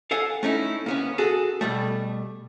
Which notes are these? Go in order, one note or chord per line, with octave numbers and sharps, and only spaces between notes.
A4 F5 F#5 G#5
A3 C#4 D#4 E4
A#3 B3 C#4
F#4 G#4 A4
B2 G3 A3